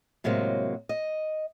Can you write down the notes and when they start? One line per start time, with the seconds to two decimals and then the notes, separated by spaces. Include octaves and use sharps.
0.24 A2 C3 F#3 G#3 A#3
0.89 D#5